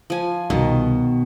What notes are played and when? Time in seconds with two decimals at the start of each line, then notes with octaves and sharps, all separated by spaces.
0.10 F3 G#5
0.50 C2 B2 D#3